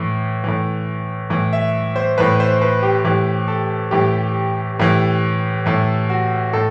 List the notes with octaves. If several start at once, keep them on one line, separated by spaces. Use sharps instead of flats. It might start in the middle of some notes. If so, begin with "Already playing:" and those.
Already playing: A2 E3
A2 E3
A2 E3
E5
C5
A2 E3 B4
C5
B4
G4
A2 E3 G4
A4
A2 E3 G4
A2 E3
A2 E3 A4
F#4
A2 A4